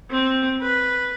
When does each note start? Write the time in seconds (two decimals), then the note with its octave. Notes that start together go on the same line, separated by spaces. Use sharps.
0.11 C4
0.62 B4